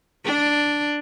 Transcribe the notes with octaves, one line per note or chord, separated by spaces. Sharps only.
D4